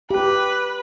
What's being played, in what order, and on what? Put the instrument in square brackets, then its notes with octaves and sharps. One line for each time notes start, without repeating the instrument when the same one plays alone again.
[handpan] G4 [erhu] B4